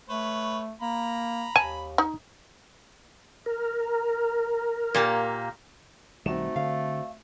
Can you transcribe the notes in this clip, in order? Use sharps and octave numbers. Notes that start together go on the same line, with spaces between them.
A3 B4 C#5
A#3 A#5 B5
D#2 G#5 A5
D#4
A#4
A#2 A#3 G4
B1 D#3 G3 A3 C4 D#4 F#4 E7
D3 D5 F5